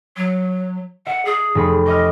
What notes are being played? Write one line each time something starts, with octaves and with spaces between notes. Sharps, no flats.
F#3
E5 F#5
G#4
F1 A3 B5
D#5 D6 D#6 F6